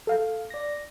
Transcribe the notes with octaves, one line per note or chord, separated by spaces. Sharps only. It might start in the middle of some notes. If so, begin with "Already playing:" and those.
A4 F5
D5 A#6